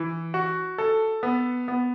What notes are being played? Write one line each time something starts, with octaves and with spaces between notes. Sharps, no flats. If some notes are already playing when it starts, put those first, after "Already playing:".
Already playing: E3
F#4
A4
B3
B3